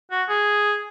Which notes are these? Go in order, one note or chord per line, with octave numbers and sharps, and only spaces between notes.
F#4
G#4